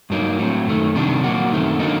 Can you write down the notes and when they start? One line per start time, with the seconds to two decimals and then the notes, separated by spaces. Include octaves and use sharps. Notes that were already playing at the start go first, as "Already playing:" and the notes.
0.10 G2 F#3 A#3 D#4
0.39 A2 F#3 C4
0.67 F#2 D#3 A3
0.95 C3 D#3 G3 D4
1.24 A#2 F#3 A#3 F#4
1.52 F#2 D#3 A3 C4
1.79 D3 F#3 A#3 D#4